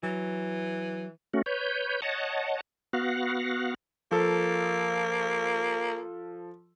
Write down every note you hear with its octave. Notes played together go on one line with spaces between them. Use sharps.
E3 F#3
A3 C#4 F#4
B4 C#5 G6
C#5 D#5 F#5 A5
B3 F#4 F5 F#5
F3 A#3 A4